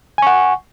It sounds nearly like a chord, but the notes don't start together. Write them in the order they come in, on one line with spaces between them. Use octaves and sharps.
G#5 C#6 F#5